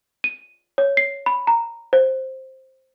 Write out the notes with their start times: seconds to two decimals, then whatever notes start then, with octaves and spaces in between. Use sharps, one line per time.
0.24 D#7
0.78 C#5
0.97 C7
1.26 B5
1.47 A#5
1.93 C5